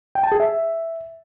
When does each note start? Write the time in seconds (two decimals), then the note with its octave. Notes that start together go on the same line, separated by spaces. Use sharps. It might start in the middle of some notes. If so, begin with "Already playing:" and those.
0.15 G5
0.23 A5
0.32 G#4
0.40 E5